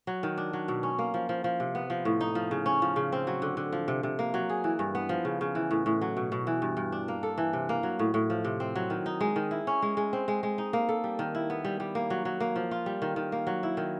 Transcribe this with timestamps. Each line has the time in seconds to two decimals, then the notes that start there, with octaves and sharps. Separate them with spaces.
0.07 F#3
0.23 D#3
0.38 D4
0.53 F#3
0.68 B2
0.83 C#4
0.99 A#3
1.14 F3
1.29 F3
1.44 F3
1.60 C3
1.75 B3
1.90 F3
2.05 A2
2.21 D#4
2.35 F3
2.51 C#3
2.66 C#4
2.82 F3
2.96 C#3
3.12 C4
3.27 F#3
3.42 D3
3.57 D3
3.72 F3
3.88 C3
4.03 C3
4.19 A#3
4.34 F#3
4.49 G#4
4.64 E3
4.79 G2
4.95 B3
5.09 F3
5.25 C#3
5.41 C#3
5.55 E3
5.71 A2
5.86 A2
6.01 F#3
6.17 B2
6.32 B2
6.47 E3
6.62 G2
6.77 G2
6.92 D4
7.08 A#3
7.23 A4
7.38 E3
7.53 C3
7.69 A#3
7.83 F#3
7.99 A2
8.14 A2
8.30 F3
8.44 C3
8.60 C4
8.75 F#3
8.90 D#3
9.06 D#4
9.21 G#3
9.36 D#3
9.51 E4
9.67 C#4
9.82 G#3
9.97 G#3
10.13 C4
10.28 G#3
10.43 G#3
10.58 D#4
10.73 A#3
10.89 A4
11.04 G3
11.19 D#3
11.35 E4
11.50 B3
11.65 G3
11.80 G3
11.95 A#3
12.10 F#3
12.25 F#3
12.40 A#3
12.56 F3
12.71 F4
12.86 G3
13.02 D#3
13.16 D#3
13.32 A#3
13.47 F#3
13.63 E4
13.77 D#3